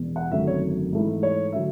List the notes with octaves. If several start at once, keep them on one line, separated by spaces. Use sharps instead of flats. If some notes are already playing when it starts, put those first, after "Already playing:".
Already playing: E1 E2 B2
F#5
G#1 F#2 D3 F#3 A3 E5
C#5
G#2 E3 A3 E4
C#5
D3 F#3 E5